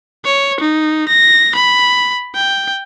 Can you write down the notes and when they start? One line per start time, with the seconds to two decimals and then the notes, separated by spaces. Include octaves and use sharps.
0.25 C#5
0.60 D#4
1.08 A#6
1.56 B5
2.35 G5